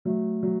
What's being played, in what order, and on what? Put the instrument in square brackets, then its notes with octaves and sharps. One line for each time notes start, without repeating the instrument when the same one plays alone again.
[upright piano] F#3 [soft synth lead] A3
[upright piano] F#3